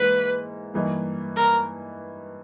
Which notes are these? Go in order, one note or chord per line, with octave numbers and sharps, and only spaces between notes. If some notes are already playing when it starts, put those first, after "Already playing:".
Already playing: G#2 E3 A#3 B4
G2 E3 A#3 D#4
A#4